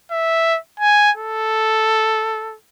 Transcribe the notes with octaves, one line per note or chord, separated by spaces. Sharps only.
E5
G#5
A4